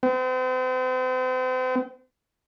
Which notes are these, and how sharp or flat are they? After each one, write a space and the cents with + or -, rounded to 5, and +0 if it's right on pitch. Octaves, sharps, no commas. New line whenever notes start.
C4 -40